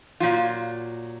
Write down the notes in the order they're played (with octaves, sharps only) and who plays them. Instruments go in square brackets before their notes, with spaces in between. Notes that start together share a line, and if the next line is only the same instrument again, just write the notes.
[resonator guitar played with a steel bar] A#2 F#3 F4